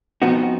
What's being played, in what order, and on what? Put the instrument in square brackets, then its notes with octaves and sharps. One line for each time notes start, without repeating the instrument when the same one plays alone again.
[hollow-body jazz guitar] F2 F3 B3 D#4 F#4